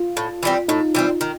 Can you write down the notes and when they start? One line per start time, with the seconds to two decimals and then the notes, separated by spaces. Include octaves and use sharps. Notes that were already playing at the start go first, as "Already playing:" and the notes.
Already playing: F4
0.17 A2
0.43 E3 G3 C4
0.68 A2 D#4
0.95 E3 G3 C4
1.21 D#3